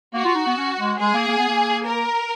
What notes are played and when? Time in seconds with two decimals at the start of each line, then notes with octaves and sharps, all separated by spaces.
0.14 A#3 F#4
0.25 F4
0.35 D#4
0.46 B3
0.57 C#4
0.78 G#3
1.00 G#3 G#4
1.14 A#3
1.28 A#3
1.38 B3
1.49 A#3
1.86 A#4